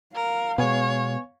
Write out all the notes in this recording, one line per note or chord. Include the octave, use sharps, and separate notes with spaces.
A#4 F5
B2 G#3 B3 C#5 G#5